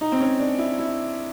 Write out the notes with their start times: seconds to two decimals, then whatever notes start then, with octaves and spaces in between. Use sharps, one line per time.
0.01 D#4
0.12 C4
0.20 C#4
0.39 D4
0.59 E4
0.78 E4